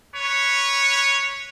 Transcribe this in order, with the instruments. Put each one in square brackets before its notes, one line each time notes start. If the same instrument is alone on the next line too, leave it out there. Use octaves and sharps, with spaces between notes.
[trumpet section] B4 C#5